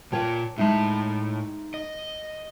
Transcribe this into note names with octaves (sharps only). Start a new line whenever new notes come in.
A#2 F4 C#5 G5 A5
A2 G#3 D#4 E5 A5
D#5